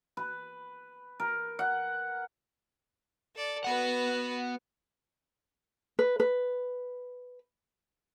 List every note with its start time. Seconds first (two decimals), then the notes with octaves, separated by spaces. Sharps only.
0.17 B4
1.20 A#4
1.59 F#5
3.35 A4 D5
3.64 B3 F#4 B4 F#5
5.99 B4
6.20 B4